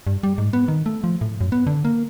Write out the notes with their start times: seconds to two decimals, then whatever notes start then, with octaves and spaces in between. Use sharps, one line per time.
0.07 G2
0.23 G3
0.38 G#2
0.53 B3
0.68 D#3
0.86 A3
1.04 F3
1.21 A2
1.41 F#2
1.52 B3
1.67 D3
1.85 A#3